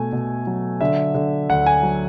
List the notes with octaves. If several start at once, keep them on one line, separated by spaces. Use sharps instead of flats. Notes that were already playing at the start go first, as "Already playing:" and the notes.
Already playing: B2 A3 G#5
B2
F#3
D3 E5
D3
D2 F#5
G#5
F#3